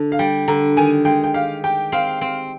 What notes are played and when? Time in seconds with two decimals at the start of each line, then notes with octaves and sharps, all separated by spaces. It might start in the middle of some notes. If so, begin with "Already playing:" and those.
Already playing: D3
0.12 F5
0.19 G3 G5
0.48 D3 A#5
0.77 D#3 G#5
1.05 G#3 G5
1.24 G5
1.34 G4 F5
1.64 G4 G5
1.92 C4 F5
2.21 C4